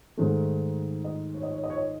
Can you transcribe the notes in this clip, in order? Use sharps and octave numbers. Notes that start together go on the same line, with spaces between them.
G#2 D#3 A3
D#5
C#5
D#5
C#5
D#5
C#5
D#5